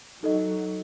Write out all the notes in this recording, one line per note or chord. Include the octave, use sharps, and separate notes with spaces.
F#3 D#4 A4 D#5